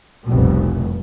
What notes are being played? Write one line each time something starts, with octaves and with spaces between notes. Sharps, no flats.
F1 C2 B2